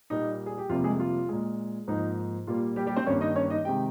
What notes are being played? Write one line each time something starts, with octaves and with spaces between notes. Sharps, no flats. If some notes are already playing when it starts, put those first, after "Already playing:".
A#2 G3 A#3 D#4
G#4
G4
F2 C3 G3 A#3 F4
G#3 G#4
F4
A#2 G#3
G#2 F3 A#3 D#4
A#2 G3 A#3 F4
G3 G4
G3 G4
C4 C5
G2 D#3 G3 A#3 C#4 C#5
D#4 D#5
C#4 C#5
D#4 D#5
C3 D#3 G#3 G4 G5